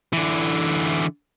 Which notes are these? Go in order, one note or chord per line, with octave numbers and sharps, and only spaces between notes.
D3 E3